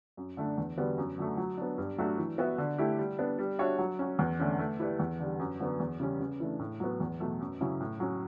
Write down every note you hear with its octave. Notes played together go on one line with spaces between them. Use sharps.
F#2
D3 A3 D4
E2
D3 G3 B3 F#4
F#2
D3 F#3 A3
F#3
B3 D4
G2
F#3 A3 D4 F#4
E3
B3 F#4 B4 E5
D3
A3 E4 G4
G3
B3 D4
G3
D4 F#4 C#5 E5
F#3
C#4 F#4
E2
D3 A3 C#4
A3
E4 G4 B4 D5
E2
D3 G3
F#2
D3 F#3 B3
E2
C#3 G3 C#4
C#3
E3 A3 D4
A2
F#3 B3
E2
B2 F#3 A3
F#2
C#3 F#3 C#4 E4
A2
F#3 C#4